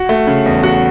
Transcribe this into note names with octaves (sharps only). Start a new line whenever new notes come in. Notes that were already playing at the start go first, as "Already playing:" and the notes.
Already playing: F#4
A3
C#3
E2
F#4